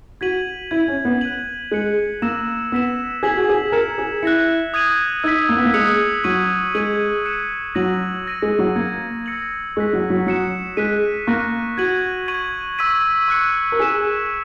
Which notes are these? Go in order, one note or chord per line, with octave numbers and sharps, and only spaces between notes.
F#4 G#6 B6 D#7 F#7
E4 G#6 D#7 F#7
C#4
B3
F#6 B6 D#7 F#7
G#3 F#6 C#7 F#7
A#3 E6 A#6 E7
B3 E6 B6 E7
G#4 G#6 B6 F#7
F#4
G#4
A#4 G#6 C#7 E7
G#4
E4 F#6 A#6 C#7
D#6 G#6 D#7 F#7
D#4 E6 G#6 B6
A#3
B3
A#3
G#3 D#6 F#6 C#7 F#7
F#3 C#6 G#6 D#7 F#7
G#3 G#6 D#7 F#7
F#6 C#7 E7
F#3 E6 A#6 D#7 F#7
E6 A#6 D#7
G#3
F#3
A#3 E6 G#6 C#7
E6 A#6 C#7 F#7
G#3 C#6 F#6 B6
F#3
F#3
F#3 D#6 F#6 C#7 E7
G#3 F#6 B6 D#7
A#3 C#6 F#6 A#6 D#7
F#4 G#6 D#7 F#7
C#6 G#6 D#7 F#7
C#6 E6 G#6 B6 D#7
C#6 F#6 C#7
A#4
G#4 E6 B6 E7